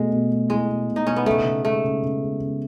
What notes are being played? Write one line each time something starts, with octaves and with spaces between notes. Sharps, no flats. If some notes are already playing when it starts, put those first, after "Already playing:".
Already playing: B2 G#3 A3
B2
A3
G#3 E4
B2
B2
D#4
B2 C#4
B3
C#3 A3
C#3
G#3 A3
C#3
C#3
G#3
C#3